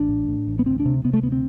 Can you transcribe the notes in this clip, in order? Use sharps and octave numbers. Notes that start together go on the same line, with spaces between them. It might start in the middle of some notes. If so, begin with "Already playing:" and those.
Already playing: A1 D4
A2
A2
A1
B3
D2 C4
D4
C3
C3 B3
A3
D2 B3
C4